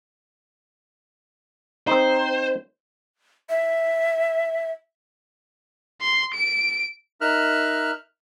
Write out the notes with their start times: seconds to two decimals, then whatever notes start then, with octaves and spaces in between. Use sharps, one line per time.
1.87 C4 D#4 C5
3.49 E5
6.02 C6
6.34 D7
7.21 D#4 A#4 E5 F6 F#6